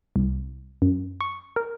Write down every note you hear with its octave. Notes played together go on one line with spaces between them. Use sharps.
C2
F#2
C#6
A#4